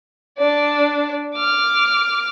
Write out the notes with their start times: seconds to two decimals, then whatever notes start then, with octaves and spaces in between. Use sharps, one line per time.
0.38 D4 D5
1.34 D6 F6